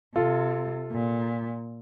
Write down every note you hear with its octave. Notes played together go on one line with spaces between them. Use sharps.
C3 F4 A4
A#2